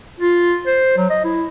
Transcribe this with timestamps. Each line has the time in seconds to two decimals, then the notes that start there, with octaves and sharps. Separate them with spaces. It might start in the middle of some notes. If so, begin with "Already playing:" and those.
0.20 F4
0.67 C5
0.97 F#3
1.10 D#5
1.24 E4